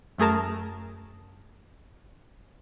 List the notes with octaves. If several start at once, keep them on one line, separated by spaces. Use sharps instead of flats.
F#2 A3 G#4 A#4 A5